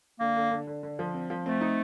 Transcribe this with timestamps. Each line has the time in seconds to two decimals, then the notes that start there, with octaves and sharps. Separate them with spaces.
0.20 D3 A#3
0.36 D3
0.51 D3
0.67 D3
0.83 D3
0.99 F3
1.14 C4
1.30 F3
1.46 A3 C4
1.61 D#4